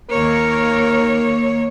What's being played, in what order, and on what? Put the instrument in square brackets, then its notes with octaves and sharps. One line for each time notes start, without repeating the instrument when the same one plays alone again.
[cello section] D#2 A#3 C#5 [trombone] A#4